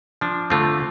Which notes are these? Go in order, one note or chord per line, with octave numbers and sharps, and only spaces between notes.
F3 D4
D3 A3 C4 F4